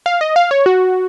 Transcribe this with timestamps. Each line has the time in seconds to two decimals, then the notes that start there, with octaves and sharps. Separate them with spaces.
0.06 F5
0.21 D#5
0.36 F5
0.51 C#5
0.66 F#4